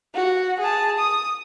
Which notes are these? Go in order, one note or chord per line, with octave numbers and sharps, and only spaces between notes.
F#4
G#4 A5
D#6